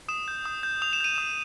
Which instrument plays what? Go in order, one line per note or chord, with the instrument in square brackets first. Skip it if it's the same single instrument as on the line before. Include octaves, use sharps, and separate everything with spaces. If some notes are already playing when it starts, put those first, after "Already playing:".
[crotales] D#6 E7
G6
D#6
G6
D#6 F7
E7
G6 D#7
D#6 E7